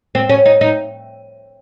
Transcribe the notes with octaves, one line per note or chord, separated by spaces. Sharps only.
C4
C#4
D#4
D#4